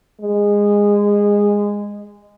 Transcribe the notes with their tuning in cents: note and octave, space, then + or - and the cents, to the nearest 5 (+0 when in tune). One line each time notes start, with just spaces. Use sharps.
G#3 -15